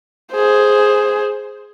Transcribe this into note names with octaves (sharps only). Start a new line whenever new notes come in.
G#4 C5